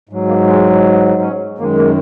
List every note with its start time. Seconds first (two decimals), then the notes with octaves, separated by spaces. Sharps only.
0.09 G#2 F#3
0.28 A#3
0.47 G#3
1.21 C#4
1.58 F#2 D#3 G#3 A#3
1.77 A#3